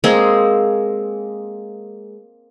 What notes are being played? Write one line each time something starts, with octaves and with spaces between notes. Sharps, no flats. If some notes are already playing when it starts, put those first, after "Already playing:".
G#3 A#3 C4 G#4